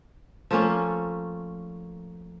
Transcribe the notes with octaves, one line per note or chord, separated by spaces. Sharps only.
F3 A3 A#3 C#4